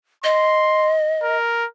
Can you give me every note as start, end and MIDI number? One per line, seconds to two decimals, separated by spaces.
0.24 1.37 75
0.24 0.92 84
1.23 1.65 70